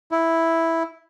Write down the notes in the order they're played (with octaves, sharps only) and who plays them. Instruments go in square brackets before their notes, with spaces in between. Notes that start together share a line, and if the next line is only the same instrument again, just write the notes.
[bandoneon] E4